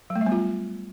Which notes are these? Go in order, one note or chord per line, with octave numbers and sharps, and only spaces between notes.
F#3
A3
G3
B3
F4